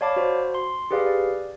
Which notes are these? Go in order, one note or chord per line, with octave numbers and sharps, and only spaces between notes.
C#5 D5 F5 A5 B5 D6
F#4 C5
C6
G4 G#4 B4 D5 F5
D5